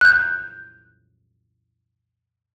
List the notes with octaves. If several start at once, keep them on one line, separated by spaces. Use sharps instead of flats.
F#6 G6